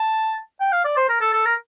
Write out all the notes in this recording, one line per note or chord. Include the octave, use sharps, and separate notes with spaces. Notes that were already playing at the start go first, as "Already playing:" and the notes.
Already playing: A5
G5
F5
D5
C5
A#4
A4
A4
A#4